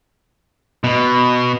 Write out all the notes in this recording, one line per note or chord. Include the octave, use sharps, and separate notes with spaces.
B2